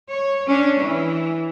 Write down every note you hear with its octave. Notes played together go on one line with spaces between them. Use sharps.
C#5
C#4 D4
E3